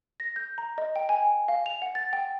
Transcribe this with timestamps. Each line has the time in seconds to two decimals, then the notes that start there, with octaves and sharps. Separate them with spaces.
0.20 A#6
0.36 G6
0.58 A#5
0.78 D#5
0.96 G5
1.09 G#5
1.48 F5
1.66 F7
1.82 F#5
1.95 A6
2.13 G5